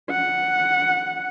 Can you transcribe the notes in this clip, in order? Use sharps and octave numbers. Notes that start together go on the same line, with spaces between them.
F#5